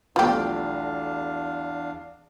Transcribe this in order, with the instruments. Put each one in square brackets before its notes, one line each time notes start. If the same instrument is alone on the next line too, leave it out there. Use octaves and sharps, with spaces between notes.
[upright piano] B1 A3 F4 [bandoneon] E2 D4 F5 [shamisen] F3 G4